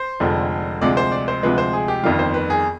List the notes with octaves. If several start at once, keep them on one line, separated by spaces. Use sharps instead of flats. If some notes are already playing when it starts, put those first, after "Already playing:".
Already playing: C5
F1 F2 D3 F3 G#3
D2 C3 F3 G#3 D5
C5
D5
C5
D2 C3 F3 G#3 B4
C5
G#4
G4
G1 F2 D#3 G3 F4
C5
B4
G#4